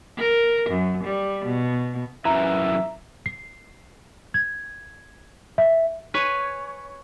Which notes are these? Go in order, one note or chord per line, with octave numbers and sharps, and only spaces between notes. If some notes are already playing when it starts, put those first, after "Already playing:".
A#4
F#2
G3
B2
F#2 E3 E5 A#5
C7
G#6
E5
B4 C#5 G#5